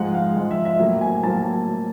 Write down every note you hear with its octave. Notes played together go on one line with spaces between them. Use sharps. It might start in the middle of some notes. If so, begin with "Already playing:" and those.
Already playing: G#2 F3 G#3 F#5
F5
G#2 F3 G#3
E5
E5
A2 F#3 A#3
G#5
A2 F#3 A#3 A5